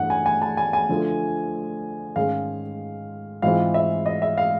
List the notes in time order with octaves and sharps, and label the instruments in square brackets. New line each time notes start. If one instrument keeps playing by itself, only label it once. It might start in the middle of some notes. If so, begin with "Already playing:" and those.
Already playing: [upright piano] G2 E3 A3 F#5
G#5
G#5
A5
G#5
G#5
D3 F3 A3
G#2 D#3 G#3 C#4 F5
G#2 E3 G#3 C4 F4 F5
E5
D#5
E5
F5